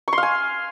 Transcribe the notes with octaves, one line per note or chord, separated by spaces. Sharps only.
C#6
C6
F5
G#5